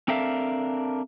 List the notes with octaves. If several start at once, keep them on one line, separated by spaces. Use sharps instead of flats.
C4 D4 A4 A#4 E5 F5